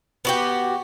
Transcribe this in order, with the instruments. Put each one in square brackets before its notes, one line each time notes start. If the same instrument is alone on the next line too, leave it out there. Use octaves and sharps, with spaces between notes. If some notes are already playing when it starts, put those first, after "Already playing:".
[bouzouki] B3 F#4 G4